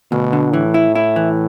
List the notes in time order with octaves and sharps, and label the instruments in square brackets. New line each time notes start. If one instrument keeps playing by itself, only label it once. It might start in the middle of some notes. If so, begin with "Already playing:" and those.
[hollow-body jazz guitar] D2 [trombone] B2
[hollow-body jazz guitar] D3
[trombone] A2 [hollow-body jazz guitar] E3
[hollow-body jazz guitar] E4
E4
E3